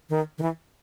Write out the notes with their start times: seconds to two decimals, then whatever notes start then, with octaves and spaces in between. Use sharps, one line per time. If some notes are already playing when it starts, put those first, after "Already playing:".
0.10 D#3
0.38 D#3
0.42 E3